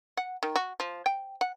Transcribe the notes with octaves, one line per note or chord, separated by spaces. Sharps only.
F#5
D#3
F#4
F3
G5
F#5